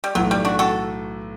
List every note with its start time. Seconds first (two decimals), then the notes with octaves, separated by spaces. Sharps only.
0.04 G3
0.15 B1 A2 E3 F#3 A3
0.31 G3
0.45 D4 F#4
0.59 F#4 A4